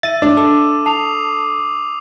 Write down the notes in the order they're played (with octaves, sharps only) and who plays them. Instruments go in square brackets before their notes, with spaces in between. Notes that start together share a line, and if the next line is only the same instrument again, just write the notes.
[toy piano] E5 [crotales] E6 D#7 [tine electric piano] A6
[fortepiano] D4 [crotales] D6
[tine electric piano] A4
[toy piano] A5 [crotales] D#6 C7 F7